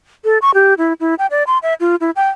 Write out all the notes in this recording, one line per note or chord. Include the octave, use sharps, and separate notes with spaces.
A4
C#6
G4
E4
E4
G5
D5
C6
E5
F4
E4
G5